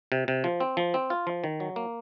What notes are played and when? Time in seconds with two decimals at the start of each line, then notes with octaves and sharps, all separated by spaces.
0.12 C3
0.28 C3
0.44 F3
0.60 C4
0.77 F3
0.94 C4
1.10 F4
1.27 F3
1.44 D#3
1.60 F#3
1.76 A#3